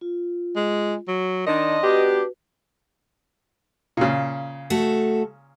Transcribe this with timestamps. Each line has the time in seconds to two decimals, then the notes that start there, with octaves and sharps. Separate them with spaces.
0.01 F4
0.56 G#3
1.08 F#3
1.47 D#3 D4 D#5 C6
1.83 B3 D4 F#4 G4 B4
3.97 A#2 C#3
4.70 A3 F#4 A4